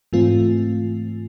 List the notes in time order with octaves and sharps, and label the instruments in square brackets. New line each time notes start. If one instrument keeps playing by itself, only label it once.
[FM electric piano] G#2 E3 A3 C4 F4